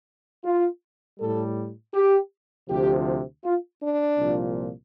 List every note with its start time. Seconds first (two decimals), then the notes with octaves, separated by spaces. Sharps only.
0.44 F4
1.19 A2 G3 A4
1.94 G4
2.69 D2 C3 F3 G4
3.44 F4
3.81 D4
4.18 C2 A#2 F3